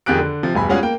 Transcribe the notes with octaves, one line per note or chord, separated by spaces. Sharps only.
F2 D#3 G4 G#4 F#6 D7
D3
C3 F3
E1 G2 G#5 B5
G3 G#3 C#4 F4 F#4 G#4
A#3 G5